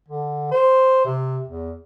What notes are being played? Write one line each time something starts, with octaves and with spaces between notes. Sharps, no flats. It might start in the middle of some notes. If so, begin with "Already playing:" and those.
D3
C5
C3
E2